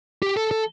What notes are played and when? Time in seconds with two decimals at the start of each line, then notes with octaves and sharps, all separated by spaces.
0.22 G4
0.37 A4
0.51 A4